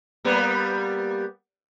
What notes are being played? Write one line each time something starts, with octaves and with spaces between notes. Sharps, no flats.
G3 A#3 B3